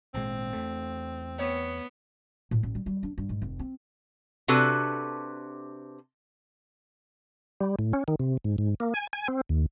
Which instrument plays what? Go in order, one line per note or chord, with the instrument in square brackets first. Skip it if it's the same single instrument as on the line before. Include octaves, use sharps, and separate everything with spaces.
[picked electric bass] G#1 A#2 G#3 [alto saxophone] C4
[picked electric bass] E2 A3
[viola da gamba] B3 [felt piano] C#5
[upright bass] A2
A1
G3
G3
D4
G2
G#2
F1
C4
[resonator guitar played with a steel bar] C3 D4 F#4 A4 B4
[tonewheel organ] G3
A2
C#4
D#3
C3
G#2
G#2
A#3
G#5
G#5
C4
D#2